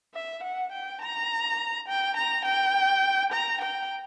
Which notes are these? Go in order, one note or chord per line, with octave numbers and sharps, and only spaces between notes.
E5
F#5
G5
A#5
G5
A#5
G5
A#5
G5